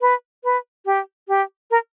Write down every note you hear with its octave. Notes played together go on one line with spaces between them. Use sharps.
B4
B4
G4
G4
A#4